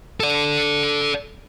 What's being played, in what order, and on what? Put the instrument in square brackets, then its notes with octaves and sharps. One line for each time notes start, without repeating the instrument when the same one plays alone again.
[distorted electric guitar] A4 D5